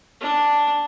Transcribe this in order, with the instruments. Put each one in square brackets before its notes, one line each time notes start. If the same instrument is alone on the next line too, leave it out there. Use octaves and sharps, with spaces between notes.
[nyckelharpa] D4